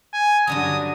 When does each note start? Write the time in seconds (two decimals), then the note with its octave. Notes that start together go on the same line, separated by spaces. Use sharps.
0.13 G#5
0.47 G2 D3 F#3 D#6